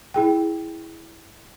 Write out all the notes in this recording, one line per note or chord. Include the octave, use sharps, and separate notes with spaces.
E4 G#4 G5